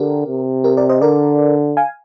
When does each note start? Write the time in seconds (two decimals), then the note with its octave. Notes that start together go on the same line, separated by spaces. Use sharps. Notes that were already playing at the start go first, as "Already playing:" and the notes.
Already playing: D3 G4 A#4
0.27 C3
0.64 G4 A#4
0.77 A#4 D5
0.89 C5 D#5
1.01 D3 A#4 D5
1.77 F5 G#5